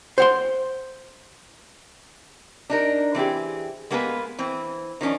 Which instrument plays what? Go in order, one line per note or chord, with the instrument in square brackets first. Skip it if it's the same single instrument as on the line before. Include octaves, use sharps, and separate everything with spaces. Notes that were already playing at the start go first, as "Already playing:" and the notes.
[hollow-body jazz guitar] C5 F#5 C6
[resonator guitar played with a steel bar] D4 D#4 A#4
E3 C4 G4 G#4
G#3 A#3 B3 G#4 A4 B4
E3 C4
D#3 F3 C#4 D4